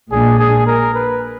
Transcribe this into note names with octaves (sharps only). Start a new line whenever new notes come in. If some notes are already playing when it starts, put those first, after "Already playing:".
A#1 A#2 G#3 D4 G#4
G#4
A#4
B4